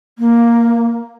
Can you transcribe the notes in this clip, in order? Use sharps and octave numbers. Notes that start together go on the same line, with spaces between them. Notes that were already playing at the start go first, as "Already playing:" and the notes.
A#3